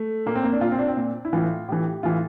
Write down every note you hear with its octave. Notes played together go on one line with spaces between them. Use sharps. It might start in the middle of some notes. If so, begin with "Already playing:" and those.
Already playing: A3
A#2 A#3
C4
A#3
D4
A#2 F4
C4
D4
C4
A#2
E4
A2 E3 F4
A2 E3 G4
A2 E3 F4